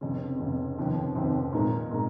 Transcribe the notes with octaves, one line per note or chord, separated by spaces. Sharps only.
F1 F2 C#3
F1 F2 C#3
F1 D#2 C#3 F3 C4
F1 D#2 C#3 F3 C4
A#2 G#3 D#4 A#4
A#2 G#3 D#4 A#4